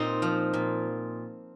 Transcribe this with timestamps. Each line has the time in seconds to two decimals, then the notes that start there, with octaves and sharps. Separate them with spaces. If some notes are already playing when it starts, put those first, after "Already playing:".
Already playing: A#2 C4 D#4
0.22 F3
0.53 A#2